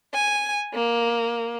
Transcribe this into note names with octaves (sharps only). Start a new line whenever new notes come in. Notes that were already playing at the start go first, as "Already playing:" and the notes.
G#5
A#3